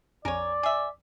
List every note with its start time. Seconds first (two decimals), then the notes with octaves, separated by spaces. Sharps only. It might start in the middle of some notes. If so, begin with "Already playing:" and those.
0.25 A#1 F2 A#4 C#5 D5 G#5
0.63 G#4 E5